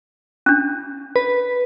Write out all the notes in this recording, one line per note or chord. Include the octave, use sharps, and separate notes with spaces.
C#4 D4
B4